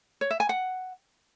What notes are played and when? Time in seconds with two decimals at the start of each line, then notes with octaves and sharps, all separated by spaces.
0.21 C#5
0.31 E5
0.40 G#5
0.49 F#5